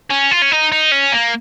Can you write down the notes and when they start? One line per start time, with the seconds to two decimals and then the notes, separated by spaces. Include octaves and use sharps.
0.10 C#4
0.31 F4
0.42 C#4
0.51 D#4
0.72 D#4
0.92 C#4
1.13 A#3